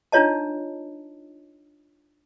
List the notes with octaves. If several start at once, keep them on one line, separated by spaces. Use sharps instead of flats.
D4 D#4 F4 C#5 D#5 A5